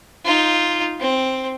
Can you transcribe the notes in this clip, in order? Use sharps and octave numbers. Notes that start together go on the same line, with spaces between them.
D#4 F4
C4